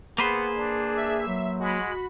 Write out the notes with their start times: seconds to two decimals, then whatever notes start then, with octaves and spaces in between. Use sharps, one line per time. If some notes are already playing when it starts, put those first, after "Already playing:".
0.18 A#3 B3 G#4 B4 C5
0.57 D4
0.97 E5
1.27 F#3
1.60 G#3 F#4 B5